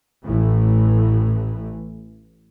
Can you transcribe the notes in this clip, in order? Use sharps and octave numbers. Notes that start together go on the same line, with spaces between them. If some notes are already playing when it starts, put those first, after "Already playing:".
A1 A2 E3